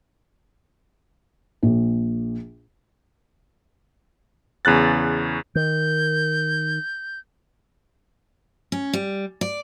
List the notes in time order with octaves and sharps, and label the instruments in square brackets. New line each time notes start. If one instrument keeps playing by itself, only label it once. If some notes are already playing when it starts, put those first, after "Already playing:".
[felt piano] A#1
[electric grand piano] E2 C#3 F#6 A6
[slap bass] D#3 [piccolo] G6
[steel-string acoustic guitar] C#4
G3
D5